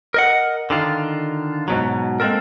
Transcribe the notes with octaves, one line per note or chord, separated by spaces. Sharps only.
A#4 D#5 F#5
D3 D#3 F4
G#2 B2 F#3
G#3 A#3 C4 A4 A#4